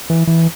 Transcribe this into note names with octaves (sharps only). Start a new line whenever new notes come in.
E3
E3